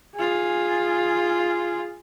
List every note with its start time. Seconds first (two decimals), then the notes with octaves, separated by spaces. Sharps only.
0.15 F4 G#4